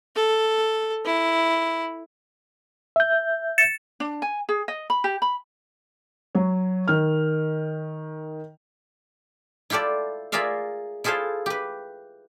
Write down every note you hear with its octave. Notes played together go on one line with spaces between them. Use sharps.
A4
E4
E5 G6
A6 C#7 E7
D4
G#5
G#4
D#5
B5
G4
B5
F#3 C#5
D#3 F6
E4 F4 G4 A4 D5
F4 G#4 A#4 D5 E5 F5
E4 F4 G#4 A4 C5 F5
G4 B4